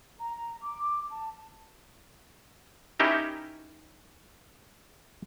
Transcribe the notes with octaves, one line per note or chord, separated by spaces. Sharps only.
A#5
D6
A5
C#4 D#4 E4 G4 A#4